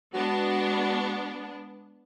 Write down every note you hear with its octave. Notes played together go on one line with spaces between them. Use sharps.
G#3 B3 D4 F#4